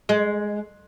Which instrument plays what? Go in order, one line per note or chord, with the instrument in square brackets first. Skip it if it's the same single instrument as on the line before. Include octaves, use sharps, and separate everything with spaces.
[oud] G#3